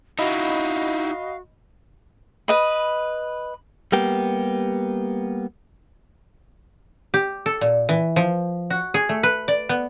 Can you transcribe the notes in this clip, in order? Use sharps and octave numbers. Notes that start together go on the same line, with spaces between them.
D#4 E4 F#4 D#5 F5 B5
B4 D#5 B5
G3 A#3 B3 G4
G4
A4
A#2
E3
F3
F#4
G#4
A3
B4
D5
B3